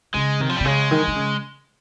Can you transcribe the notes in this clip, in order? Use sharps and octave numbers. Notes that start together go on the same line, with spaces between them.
C#3 G#3
C3 D#3
F3
G3
C3
C#3 G#3
D#3
D#3
C#3